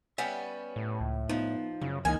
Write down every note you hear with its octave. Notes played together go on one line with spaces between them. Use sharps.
G3 B3 C#4 E5 F#5 G5
A2
C#2
F3 B3 D#4
F#2 C#3
C#2 E3 A#3 D#4 G#5